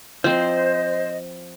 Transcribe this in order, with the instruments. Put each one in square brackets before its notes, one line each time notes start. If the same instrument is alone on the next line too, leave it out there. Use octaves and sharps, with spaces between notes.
[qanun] F3 C4 [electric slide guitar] C5 [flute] D#5